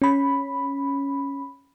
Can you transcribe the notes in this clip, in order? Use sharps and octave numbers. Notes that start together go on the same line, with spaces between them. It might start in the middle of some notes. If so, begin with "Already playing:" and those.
C#4 B5